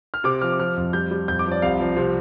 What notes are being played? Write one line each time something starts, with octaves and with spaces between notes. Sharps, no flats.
F6
C3 D6
F3 F6
D6
F3 F6
F2
G3 G6
G3
F2 G6
D6
F3
D5
C2 F5
F3
C3